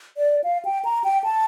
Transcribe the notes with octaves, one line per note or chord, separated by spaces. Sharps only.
D5
F5
G5
A#5
G5
A5